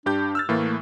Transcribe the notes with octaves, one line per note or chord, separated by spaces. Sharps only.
G2 D4 G4 G6
E6 F6 A6
A2 E3 A3 A#3